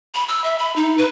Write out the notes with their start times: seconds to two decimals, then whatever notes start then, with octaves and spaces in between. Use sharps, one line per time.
0.15 B5
0.28 E6
0.44 E5
0.59 B5
0.76 D#4
0.98 B4